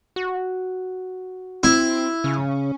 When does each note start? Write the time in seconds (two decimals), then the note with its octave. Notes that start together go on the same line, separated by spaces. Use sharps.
0.16 F#4
1.63 C4 E4
2.24 C#3 C#4